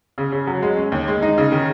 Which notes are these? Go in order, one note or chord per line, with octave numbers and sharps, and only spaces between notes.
C#3
C#3
F#3
G#3
C#4
D#2
G#3
D#4
C#3
D#3